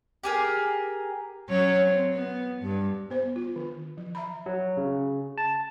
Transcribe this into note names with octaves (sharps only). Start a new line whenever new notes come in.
G4 G#4 A#4
F#3 C#4 C#5
C4
B3
G2
B3 C5
F4
D#3
F3
E5 A#5 B5
F#3
C#3
A5